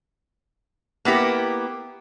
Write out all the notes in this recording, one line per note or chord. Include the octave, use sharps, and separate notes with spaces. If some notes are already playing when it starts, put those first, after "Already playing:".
A#3 B3 E4 G4